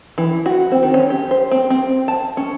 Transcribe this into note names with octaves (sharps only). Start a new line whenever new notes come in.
E3
F#4
C4
D#3
C#4
G4
C5
C4
C4
A5
C#4